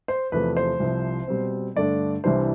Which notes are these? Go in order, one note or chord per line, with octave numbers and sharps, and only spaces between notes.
C5
E2 C3 F3 A3 B4
C5
C2 C3 F3
B2 G3 C4
G2 D3 A3 D4 D5
C2 C3 E3 G3 D4 C5